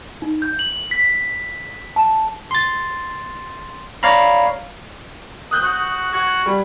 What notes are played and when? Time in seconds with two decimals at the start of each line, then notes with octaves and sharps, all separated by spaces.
0.22 D#4
0.42 G6
0.59 F#7
0.91 B6
1.96 A5
2.51 C6 A6
4.03 C#5 D5 F5 A#5 B5
5.51 D#6 F#6 G6
5.63 F#4
6.13 F#4 G#6
6.46 G3